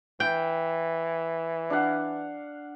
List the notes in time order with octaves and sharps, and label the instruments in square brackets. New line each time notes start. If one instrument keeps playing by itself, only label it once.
[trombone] E3 [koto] G5
[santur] D4 F5 F#5